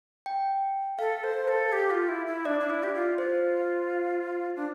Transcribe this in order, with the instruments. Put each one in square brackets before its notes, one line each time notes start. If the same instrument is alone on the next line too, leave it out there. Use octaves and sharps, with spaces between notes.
[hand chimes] G5
[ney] A4 [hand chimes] F5
[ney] C5
A4
G4
F4
E4
E4
[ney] D4 [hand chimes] D5
[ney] D4
E4
G4
F4
[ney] F4 [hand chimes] C5
[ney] D4